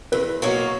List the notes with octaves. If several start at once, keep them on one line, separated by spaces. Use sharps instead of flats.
E2 B4
B2 F#3 A#3 C#5